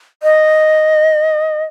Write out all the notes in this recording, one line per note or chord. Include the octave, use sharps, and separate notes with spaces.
D#5